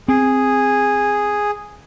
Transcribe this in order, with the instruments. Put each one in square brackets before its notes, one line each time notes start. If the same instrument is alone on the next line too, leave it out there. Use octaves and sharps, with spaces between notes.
[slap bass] C4 [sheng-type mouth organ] G#4